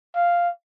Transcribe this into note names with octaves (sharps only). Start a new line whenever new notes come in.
F5